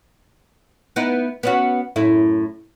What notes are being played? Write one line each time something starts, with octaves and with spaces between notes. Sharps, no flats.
B3 D#4 E4
B3 C#4 F#4
F#2 A2 E4